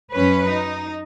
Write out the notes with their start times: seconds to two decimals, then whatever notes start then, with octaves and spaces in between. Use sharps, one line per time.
0.13 F#2 C#4 B4
0.47 D#4